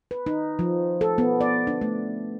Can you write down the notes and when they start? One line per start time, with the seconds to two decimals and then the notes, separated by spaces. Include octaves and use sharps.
0.11 B4
0.26 D#4
0.59 F3
1.01 A4
1.18 B3
1.41 D5
1.67 D4
1.81 A3